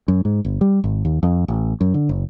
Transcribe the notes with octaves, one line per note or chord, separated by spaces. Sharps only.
F#2
G#2
G1
G3
G#1
D#2
F2
A1
F#2
D3
F#1